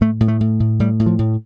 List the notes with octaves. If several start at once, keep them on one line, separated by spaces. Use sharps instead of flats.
A2 A3
A2
A3
A2
A2
A2 G3
A2
F3
A2